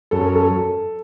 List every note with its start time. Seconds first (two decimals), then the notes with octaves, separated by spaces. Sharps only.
0.11 F#2 A4
0.24 A#4
0.35 A4